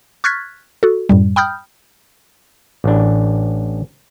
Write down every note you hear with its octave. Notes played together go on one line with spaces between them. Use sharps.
C#6 F6 F#6 G#6 A6 B6
F#4 A4
F#2 A2 G3
G5 B5 D#6 F6 G6
A1 D4